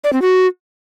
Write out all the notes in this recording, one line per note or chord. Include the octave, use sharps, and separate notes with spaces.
D5
C4
F#4